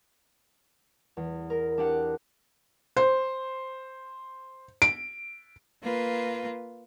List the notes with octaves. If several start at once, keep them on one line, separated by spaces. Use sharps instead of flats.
E2
A#4
D4 G4 F#5
C5
D7
A#3 F4 B4